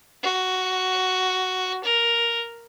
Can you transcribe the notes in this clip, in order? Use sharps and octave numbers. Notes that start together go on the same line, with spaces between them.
F#4
A#4